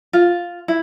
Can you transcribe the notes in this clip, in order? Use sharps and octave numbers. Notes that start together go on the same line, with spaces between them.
F4
E4